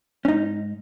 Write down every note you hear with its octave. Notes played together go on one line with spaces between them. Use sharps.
C#4
G#2 D#4